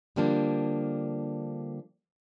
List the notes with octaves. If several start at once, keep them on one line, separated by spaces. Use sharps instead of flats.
D3 F3 G3 A#3 D4